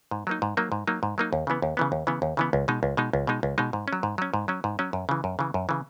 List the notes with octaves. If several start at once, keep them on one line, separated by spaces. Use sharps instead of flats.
G#2
F#3 A#3 D#4
G#2
F#3 A#3 D#4
G#2
F#3 A#3 D#4
G#2
F#3 A#3 D#4
D#2
C#3 E3 B3
D#2
C#3 E3 B3
D#2
C#3 E3 B3
D#2
C#3 E3 B3
C#2
B2 G#3 D#4
C#2
B2 G#3 D#4
C#2
B2 G#3 D#4
C#2
B2 G#3 D#4
G#2
C#4
F#3
G#2
F#3 C#4
G#2
F#3 C#4
G#2
F#3 C#4
F#2
C#3 E3
F#2
C#3 E3
F#2
C#3 E3